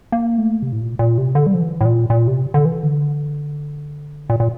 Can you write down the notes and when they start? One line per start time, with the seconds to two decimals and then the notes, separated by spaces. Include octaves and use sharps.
0.12 A#3
0.38 A3
0.62 C3
0.72 A2
0.81 A#2
0.99 A#2
1.18 C3
1.35 D3
1.47 G3
1.54 F3
1.60 E3
1.81 A2
1.85 A#2
2.10 A#2
2.27 C3
2.54 D3
2.65 E3
2.83 D3
4.30 A#2
4.40 A#2